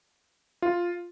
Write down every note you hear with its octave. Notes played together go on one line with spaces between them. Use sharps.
F4